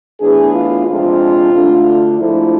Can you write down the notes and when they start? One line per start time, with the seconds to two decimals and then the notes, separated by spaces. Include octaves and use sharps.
0.21 A2 E3 B3 D4 G#4
0.53 F4
0.87 F2 C3 G#3 D4 F4
1.53 D2 D3 A3 D4
2.18 G#2 F3 A3 D4 E4